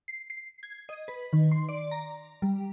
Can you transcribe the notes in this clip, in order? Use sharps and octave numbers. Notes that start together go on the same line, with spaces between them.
C7
C7
G#6
D#5
B4
D#3
C6
D5
A#5
G3